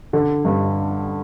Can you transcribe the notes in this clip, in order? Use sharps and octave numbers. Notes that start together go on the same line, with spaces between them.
D3
G2